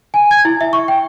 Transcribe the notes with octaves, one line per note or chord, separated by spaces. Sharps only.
G#5
G#6
E4
E5
C#6
G5